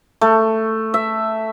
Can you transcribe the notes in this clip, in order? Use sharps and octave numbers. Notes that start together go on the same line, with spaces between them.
A3
E5